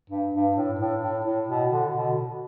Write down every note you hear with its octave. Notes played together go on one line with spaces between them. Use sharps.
G2
G2
A2
A2
A2
A2
B2
D3
B2